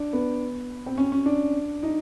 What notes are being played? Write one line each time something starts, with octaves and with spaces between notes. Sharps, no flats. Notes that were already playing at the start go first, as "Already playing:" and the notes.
Already playing: D4
B3
C4
C#4
C#4
D4
D#4